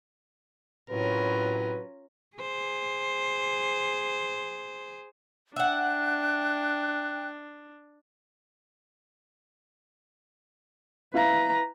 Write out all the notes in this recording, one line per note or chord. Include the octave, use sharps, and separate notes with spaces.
A2 C3 F#3 C#4 F4 A#4 B4
G#4 C5
D4 E5 F#5 G5 F#6
E4 B4 F5 A#5